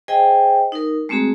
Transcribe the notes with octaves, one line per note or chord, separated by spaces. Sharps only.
G#4 C5 D#5 G5 G#5
D#4 A#4
G#3 A3 C4 F#4 G#4 A#5